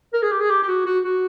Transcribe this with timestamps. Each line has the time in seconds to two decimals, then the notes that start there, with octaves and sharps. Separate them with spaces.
0.13 A#4
0.22 G#4
0.32 G4
0.41 G#4
0.50 G4
0.63 G4
0.68 F#4
0.86 F#4
1.04 F#4